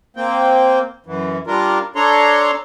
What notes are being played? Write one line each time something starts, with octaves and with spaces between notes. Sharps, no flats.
A#3 C4 G5
F#2 E3
G3 D4 F4 A#4
D4 A4 C#5 A#5 C6